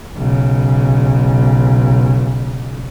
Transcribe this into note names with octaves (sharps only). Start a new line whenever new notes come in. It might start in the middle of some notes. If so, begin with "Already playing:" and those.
B1 C#3